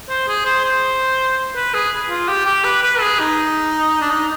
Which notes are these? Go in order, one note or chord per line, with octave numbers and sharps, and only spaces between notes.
C5
G#4
C5
C5
B4
G#4
F4
G4
G4
B4
B4
G#4
D#4
D4
D#4